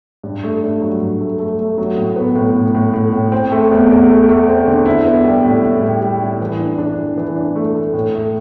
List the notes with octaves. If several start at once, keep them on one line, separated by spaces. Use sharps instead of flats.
G2
A3
G2
F#3
G2
A3
A3
A3
F#3
A2
B3
A2
A2
A2
A2
A2
C4
A3
E2
E2
A3
A3
C4
D3
E4
B3
G3
A2
A2
G3
G3
E4
E3
D4
D4
E3
E3
D4
A3
A3
A2
A3